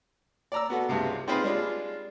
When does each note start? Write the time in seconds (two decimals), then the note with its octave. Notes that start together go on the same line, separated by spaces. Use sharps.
0.52 D5 A#5 E6
0.70 B3 F#4 A4
0.89 C#2 G2 C3 G#3
1.28 C4 D#4 F4 G#4 B4 C5
1.43 G3 G#3 D4 F4